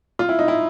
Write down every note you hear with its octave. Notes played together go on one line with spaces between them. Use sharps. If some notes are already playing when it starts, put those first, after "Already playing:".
F4
E4
D#4
E4